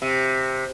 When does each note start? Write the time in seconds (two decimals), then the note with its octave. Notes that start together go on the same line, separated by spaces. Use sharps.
0.02 C3